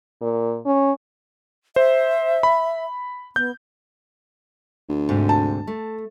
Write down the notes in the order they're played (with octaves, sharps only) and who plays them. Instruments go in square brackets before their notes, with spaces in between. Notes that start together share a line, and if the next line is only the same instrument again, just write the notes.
[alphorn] A#2
C#4
[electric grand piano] C5 [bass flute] E5
[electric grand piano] B5
[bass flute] B3 [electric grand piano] G6
[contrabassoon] D2
[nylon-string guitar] G#2 C3
[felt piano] A5
[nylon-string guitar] A3